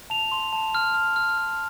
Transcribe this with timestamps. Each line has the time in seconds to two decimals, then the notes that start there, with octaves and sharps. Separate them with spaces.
0.10 A5 F7
0.32 C6
0.53 A5
0.75 F6
0.94 F6
1.16 F6
1.38 F6